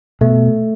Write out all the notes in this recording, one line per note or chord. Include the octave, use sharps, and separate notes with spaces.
B2 A3